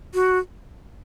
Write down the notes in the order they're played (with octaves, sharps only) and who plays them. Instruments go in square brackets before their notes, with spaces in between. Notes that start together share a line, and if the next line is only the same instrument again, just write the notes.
[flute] F#4